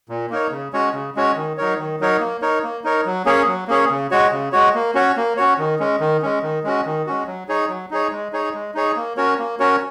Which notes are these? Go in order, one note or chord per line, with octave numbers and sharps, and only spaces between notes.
A#2
A#3 D#4 A#4 C#5
C#3
G#3 C#4 F#4 C#5
C#3
G#3 C#4 F#4 C#5
D#3
F#3 D#4 A#4 C#5
D#3
F#3 D#4 A#4 C#5
A#3
D#4 A#4 C#5
A#3
D#4 A#4 C#5
F#3
A#3 C#4 G#4 C#5
F#3
A#3 C#4 G#4 C#5
C#3
G#3 F#4 C#5
C#3
G#3 F#4 C#5
A#3
C#4 F#4 C#5
A#3
C#4 F#4 C#5
D#3
G#3 C#4
D#3
G#3 C#4
D#3
G#3 C#4 F#4
D#3
G#3 C#4 F#4
F#3
D#4 G#4 C#5
F#3
D#4 G#4 C#5
G#3
D#4 G#4 C#5
G#3
D#4 G#4 C#5
A#3
C#4 F#4 A#4 C#5
A#3
C#4 F#4 A#4 C#5